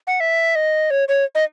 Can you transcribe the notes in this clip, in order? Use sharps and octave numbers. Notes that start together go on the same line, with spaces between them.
F#5
E5
D#5
C#5
C#5
D#5